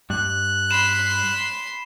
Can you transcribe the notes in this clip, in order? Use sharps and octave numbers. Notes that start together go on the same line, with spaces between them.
G2 F#6
B5 C6 E7